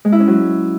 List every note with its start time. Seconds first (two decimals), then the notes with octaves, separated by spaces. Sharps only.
0.05 G#3
0.12 E4
0.20 C#4
0.28 F#3